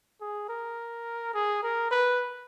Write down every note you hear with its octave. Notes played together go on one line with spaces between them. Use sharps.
G#4
A#4
G#4
A#4
B4